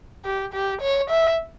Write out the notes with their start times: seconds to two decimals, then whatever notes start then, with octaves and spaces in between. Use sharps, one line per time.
0.25 G4
0.54 G4
0.82 C#5
1.10 E5